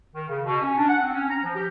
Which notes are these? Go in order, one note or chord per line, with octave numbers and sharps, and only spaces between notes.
D#3
C#3
B2
C#4
D4
F#5
C4
C#4
A#5
F3
G4